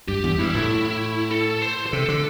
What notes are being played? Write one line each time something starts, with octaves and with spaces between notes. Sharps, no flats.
G2 G4
E2
G2 E4
A2
A4
C5
C5
C3 A4
D3